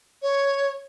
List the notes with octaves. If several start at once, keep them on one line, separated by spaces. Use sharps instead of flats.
C#5